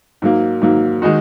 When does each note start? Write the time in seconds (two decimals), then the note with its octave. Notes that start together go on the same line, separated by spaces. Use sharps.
0.22 G#2 F#3 A#3
0.62 G#2 F#3 A#3
1.02 D#3 G#3 D#4 F#4